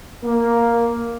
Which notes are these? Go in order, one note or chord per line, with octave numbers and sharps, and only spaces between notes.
A#3